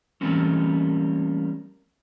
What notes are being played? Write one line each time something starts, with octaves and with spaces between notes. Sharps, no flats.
E3 G3 A3 A#3 C4 C#4